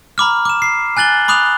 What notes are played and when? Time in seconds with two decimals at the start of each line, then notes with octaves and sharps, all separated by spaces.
0.18 A#5 B5 D6 F6
0.45 D6 E7
0.62 C7
0.97 G#5 F#6 A6 F#7 G7
1.28 B5 D6 D#6 F#6 F7